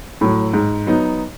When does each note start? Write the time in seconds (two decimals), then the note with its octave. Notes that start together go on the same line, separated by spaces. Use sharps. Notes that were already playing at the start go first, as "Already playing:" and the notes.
0.21 A2 F#3
0.53 G#2
0.86 F#3 B3 D#4